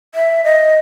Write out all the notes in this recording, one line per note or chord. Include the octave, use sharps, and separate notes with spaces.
E5
D#5